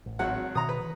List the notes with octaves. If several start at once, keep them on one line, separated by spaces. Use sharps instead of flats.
A1
G#1 F#3 F#5
B2 D#3 A#5 D#6
B4
E3